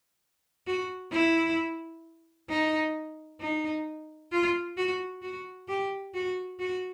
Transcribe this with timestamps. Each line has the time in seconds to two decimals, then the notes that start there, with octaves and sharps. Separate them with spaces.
0.67 F#4
1.12 E4
2.49 D#4
3.40 D#4
4.32 F4
4.77 F#4
5.22 F#4
5.68 G4
6.14 F#4
6.59 F#4